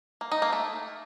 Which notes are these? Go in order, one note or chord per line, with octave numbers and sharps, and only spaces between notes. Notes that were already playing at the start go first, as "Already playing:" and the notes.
A#3
D#4
A#3
A3